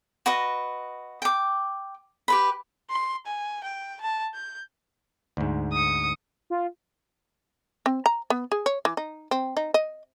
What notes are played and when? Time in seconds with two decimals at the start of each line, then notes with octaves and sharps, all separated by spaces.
0.26 F#4 B4 D#5
1.22 G5 D6
2.28 G4 B4 B5
2.90 C6
3.27 G#5
3.64 G5
4.01 A5
4.34 G6
5.37 D2 G#2
5.73 D#6 C#7
6.50 F4
7.86 C4
8.06 A#5
8.30 B3
8.52 G#4
8.66 C#5
8.85 E3
8.97 D#4
9.31 C4
9.57 D#4
9.74 D#5